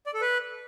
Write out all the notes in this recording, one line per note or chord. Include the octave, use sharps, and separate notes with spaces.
D5
A4
B4